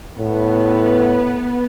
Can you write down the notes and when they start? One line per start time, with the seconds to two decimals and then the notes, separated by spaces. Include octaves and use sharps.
0.19 A2 B3